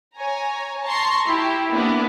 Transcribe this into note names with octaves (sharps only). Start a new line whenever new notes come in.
C#5 G#5 A#5
A5 A#5 C6 C#6
E4 G4
A#3 B3 D4 E4